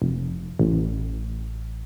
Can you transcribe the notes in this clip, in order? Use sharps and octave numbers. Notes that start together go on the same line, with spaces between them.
F1
A1